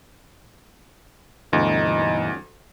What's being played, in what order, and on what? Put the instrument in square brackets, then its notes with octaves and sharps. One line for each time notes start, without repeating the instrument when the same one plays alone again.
[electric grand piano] D2 [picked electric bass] G2 B2 E3 [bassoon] D#4